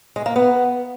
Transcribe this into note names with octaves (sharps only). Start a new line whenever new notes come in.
G#3
A#3
B3